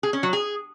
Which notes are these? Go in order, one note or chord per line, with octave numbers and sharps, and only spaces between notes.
G#4
C#4
F#3
G#4